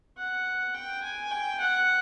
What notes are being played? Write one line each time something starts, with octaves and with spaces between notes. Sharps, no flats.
F#5
G5
G#5
G5
F#5